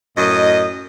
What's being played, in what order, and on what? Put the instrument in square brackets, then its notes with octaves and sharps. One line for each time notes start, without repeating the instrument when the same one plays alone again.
[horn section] F#2 A2 D#5